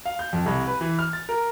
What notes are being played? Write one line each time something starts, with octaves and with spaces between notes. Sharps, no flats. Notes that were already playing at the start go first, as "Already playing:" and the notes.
F5
G6
F2
C2
B4
E3
F6
A6
A#4